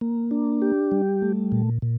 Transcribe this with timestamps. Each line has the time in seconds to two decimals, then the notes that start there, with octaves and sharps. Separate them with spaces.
0.01 A#3
0.31 D4
0.62 G4
0.92 G3
1.22 A3
1.52 A#2
1.82 A#2